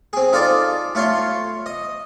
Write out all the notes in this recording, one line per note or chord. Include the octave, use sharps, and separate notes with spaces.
C4 G#4
D#4 F4 A4 D5
A3 F4 C#5 C6
D#5